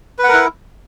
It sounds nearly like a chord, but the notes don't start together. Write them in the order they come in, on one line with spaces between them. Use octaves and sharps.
B4 F#5 A#4 E4